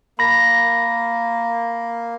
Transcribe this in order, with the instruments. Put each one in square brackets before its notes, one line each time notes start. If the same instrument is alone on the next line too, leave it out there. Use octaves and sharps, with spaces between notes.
[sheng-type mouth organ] A#3 [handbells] B5 A#6